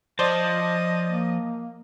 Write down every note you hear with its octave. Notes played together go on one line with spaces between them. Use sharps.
F3 C5 D5 D#5 A5
A#3